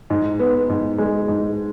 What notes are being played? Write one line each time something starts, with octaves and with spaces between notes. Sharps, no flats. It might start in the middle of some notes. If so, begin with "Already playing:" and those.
G#2
B3
G#2
G#3
G#2